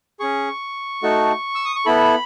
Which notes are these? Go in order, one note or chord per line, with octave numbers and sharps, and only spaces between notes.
C#4 G#4 C#6
A3 D#4 F#4 A4
E6
D#6
C#6
B3 E4 A4 B5